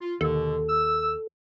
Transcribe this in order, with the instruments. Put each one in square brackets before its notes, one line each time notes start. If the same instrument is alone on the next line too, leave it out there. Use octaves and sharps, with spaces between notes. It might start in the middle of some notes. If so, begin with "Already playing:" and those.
[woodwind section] F4
[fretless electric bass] D#2 [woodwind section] B2 D3 [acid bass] A4
[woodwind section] E6